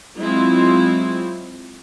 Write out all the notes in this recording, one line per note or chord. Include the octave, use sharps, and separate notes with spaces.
F#3 G#3 C4 E4 F4